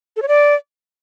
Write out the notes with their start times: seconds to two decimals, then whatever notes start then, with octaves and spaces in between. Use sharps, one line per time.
0.16 A4
0.22 C#5
0.28 D5